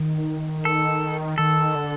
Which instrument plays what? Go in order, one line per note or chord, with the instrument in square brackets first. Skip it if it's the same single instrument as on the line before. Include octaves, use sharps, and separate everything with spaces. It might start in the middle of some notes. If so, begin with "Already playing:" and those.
Already playing: [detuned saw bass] D#3
[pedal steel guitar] A4
[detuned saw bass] D#3 [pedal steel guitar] A4
[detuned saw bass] D3